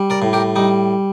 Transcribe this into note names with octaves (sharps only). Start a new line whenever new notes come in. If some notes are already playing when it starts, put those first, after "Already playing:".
Already playing: G3
A#4 D5
A2
G4 A#4
G3 D#4